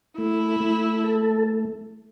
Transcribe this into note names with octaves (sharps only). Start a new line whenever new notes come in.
A3 E4
A3
A4